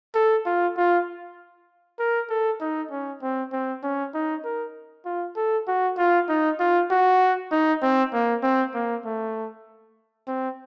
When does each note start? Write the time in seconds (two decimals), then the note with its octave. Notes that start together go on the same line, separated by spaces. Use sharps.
0.15 A4
0.46 F4
0.77 F4
1.99 A#4
2.30 A4
2.61 D#4
2.91 C#4
3.22 C4
3.52 C4
3.83 C#4
4.14 D#4
4.45 A#4
5.06 F4
5.36 A4
5.68 F#4
5.98 F4
6.29 D#4
6.60 F4
6.91 F#4
7.52 D#4
7.82 C4
8.13 A#3
8.43 C4
8.74 A#3
9.05 A3
10.28 C4